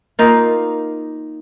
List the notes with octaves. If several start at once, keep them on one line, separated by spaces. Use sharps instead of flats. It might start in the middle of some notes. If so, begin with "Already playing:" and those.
A#3 D#4 F4